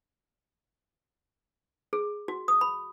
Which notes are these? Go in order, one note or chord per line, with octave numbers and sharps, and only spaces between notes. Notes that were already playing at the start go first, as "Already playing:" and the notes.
G#4
F#4
D#6
B5